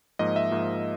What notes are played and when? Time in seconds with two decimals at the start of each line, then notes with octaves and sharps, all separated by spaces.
0.19 G#2 F3 A#3 D#5
0.36 E5
0.51 G#2 F3 A#3